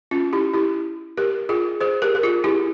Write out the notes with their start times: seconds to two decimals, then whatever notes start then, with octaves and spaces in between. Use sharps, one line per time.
0.11 C#4 F4
0.33 E4 G4
0.53 E4 G4
1.17 G4 A#4
1.49 F4 G#4
1.81 G#4 C5
2.02 G4 A#4
2.15 A#4
2.23 F4 G#4
2.44 E4 G4